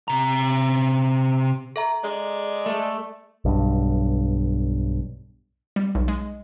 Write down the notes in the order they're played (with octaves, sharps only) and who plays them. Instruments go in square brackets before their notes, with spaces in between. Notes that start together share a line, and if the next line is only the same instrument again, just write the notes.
[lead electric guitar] C3 A#5
[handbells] A4 E5 A#5
[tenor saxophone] G#3 [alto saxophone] D5
[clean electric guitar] A3
[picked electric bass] B1 G2
[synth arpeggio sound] G3
B1
G#3